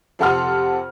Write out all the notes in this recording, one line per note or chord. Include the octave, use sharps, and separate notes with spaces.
F2 C3 A4 F#5 C6 F6